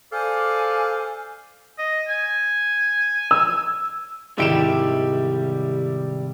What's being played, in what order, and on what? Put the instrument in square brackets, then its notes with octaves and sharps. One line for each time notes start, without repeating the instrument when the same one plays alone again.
[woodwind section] A4 C5 D5 F5 G#5
[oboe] D#5
G#5
[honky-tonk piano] E6
[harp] C2 G#2 D#3 [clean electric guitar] G3 G4 [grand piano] E4 D7 E7